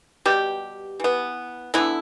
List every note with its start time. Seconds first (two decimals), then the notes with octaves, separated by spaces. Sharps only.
0.26 B2 G3 B3 G4
1.00 E3 B3
1.74 D3 E3 F3 B3 E4